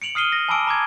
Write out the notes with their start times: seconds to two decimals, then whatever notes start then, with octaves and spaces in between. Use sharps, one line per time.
0.02 C#7 D7 F7 F#7
0.15 D#6 F6 C7 D#7 G7
0.32 A#6
0.48 G#5 A5 B5 D6 E6 D7
0.67 A#5 D6 G#6